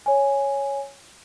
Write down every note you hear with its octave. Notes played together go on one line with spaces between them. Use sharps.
C#5 G#5